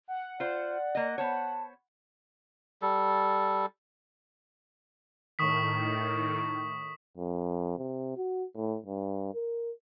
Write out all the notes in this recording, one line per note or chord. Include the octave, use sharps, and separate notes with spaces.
F#5
F4 C5 D5
A#3 D#5
B3 C5 C#5 A5
G3 A4
A2 D#3 C#6 D#6 B6
F2
C3
F#4
A2
G2
A#4